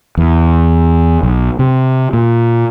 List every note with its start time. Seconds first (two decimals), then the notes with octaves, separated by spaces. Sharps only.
0.17 E2
1.23 B1
1.59 C3
2.13 A#2